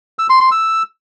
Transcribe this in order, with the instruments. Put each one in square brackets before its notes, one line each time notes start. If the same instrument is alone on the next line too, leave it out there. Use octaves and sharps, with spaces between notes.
[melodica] E6
C6
C6
E6